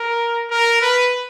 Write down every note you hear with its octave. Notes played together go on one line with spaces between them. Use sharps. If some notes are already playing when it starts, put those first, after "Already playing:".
Already playing: A#4
A#4
B4